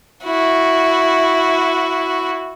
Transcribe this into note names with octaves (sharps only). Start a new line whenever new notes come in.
E4 F#4